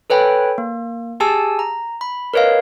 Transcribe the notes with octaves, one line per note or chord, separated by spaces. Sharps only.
A4 B4 C#5 G5 G#5 B5
A#3
G4 G#4 G#5 A5 E6
A#5
B5
A#4 B4 C#5 D#5 F5